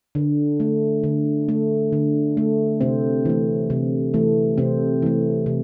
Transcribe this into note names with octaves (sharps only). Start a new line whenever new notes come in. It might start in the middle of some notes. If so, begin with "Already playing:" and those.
D3
A3
D3
A3
D3
A3
C3 C4
E3 A3
C3
E3 A3
C3 C4
E3 A3
C3